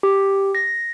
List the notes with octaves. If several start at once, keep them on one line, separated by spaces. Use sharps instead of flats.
G4
A#6